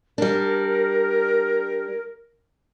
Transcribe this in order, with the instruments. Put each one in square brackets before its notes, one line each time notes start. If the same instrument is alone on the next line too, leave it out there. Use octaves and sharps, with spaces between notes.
[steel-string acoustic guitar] G3 D4 [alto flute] A#4